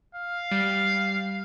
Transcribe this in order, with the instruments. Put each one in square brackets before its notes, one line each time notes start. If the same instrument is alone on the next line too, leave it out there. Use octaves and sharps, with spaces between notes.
[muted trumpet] F5
[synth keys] G3